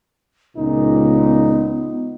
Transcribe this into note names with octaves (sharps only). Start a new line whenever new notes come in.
C#2 A#2 B3 D#4